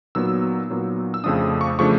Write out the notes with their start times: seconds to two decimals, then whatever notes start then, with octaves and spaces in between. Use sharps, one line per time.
0.15 A#2 F#3 B3 D#4 E6
0.70 A#2 F#3 B3 D#4
1.14 E6
1.24 F2 C#3 F3 A3 D4 D#6
1.61 C#6
1.79 C#3 F3 A3 D4 C#6